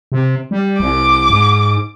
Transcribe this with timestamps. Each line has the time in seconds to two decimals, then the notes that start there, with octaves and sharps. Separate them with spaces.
0.12 C3
0.51 G3
0.80 C2 D6
1.30 G#2